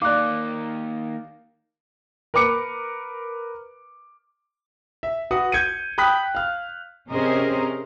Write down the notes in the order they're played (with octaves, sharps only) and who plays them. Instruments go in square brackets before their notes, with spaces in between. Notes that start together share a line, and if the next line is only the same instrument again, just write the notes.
[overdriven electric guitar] D#3 A#3 [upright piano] D5 F5 [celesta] D6 F#6
[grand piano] A#4 B4 D6 C#7
E5
F#4 B4 F#5 D#6
G6 G#6 C#7 D#7
G5 B5 D#6 F#6 B6
F5 F6
[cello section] C3 C#4 G#4 A#4 C5 D#5